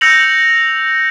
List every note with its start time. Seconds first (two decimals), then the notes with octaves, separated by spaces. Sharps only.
0.01 E6 G6 A#6 C#7 F7 F#7